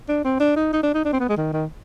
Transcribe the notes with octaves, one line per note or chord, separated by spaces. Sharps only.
D4
C4
D4
D#4
D#4
D4
D#4
D4
C4
B3
G#3
D#3
D#3